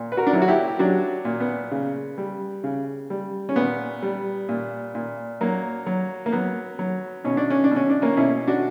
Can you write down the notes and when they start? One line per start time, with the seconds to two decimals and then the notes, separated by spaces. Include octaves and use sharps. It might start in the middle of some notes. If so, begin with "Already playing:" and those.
Already playing: A#2
0.12 B4
0.17 F#4 A#4
0.27 D4
0.33 F#3 E4
0.42 F#4
0.48 E4 G4
0.68 G4
0.79 F#3 D4 F#4
1.25 A#2
1.40 B3
1.71 C#3
2.18 G3
2.64 C#3
3.10 G3
3.49 C#4
3.56 A#2 B3
4.03 G3
4.49 A#2
4.95 A#2
5.41 F#3 A#3
5.86 F#3
6.26 A#3
6.32 F#3 B3
6.79 F#3
7.24 B2 C#4
7.37 D4
7.50 C#4
7.64 D4
7.71 B2
7.76 C#4
7.90 D4
8.02 A#3 C#4
8.17 B2 C#4 E4
8.47 D4 F#4